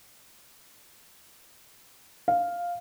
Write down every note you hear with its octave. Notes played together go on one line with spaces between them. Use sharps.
F5